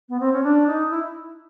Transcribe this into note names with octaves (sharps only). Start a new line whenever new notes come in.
B3
C4
C#4
D4
D#4
E4